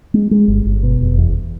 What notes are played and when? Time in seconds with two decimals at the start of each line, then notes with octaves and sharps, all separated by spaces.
0.14 G#3
0.31 G#3
0.48 G1
0.65 G1
0.83 B2
1.01 F1
1.18 E2